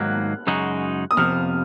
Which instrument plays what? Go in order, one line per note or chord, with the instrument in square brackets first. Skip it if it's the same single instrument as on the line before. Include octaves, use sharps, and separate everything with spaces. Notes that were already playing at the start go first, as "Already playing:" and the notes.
Already playing: [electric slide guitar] G#2 D#3 F#3 A#3 [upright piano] F6 F#6
[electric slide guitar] F#2 C#3 G#3 D#4 F#4
[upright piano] D#6
[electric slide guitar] F2 C3 F3 [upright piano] F6